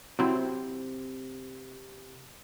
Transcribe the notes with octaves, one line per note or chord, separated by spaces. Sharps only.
C3 F#3 C4 E4